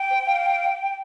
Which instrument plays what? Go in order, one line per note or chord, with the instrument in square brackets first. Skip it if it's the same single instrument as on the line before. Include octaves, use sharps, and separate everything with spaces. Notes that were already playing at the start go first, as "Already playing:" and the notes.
Already playing: [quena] G5
[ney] C5
F5